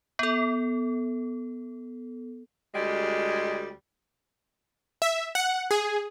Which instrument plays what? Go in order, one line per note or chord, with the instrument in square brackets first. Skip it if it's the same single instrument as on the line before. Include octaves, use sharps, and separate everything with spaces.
[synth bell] B3 A4
[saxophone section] D2 G3 G#3
[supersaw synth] E5
F#5
G#4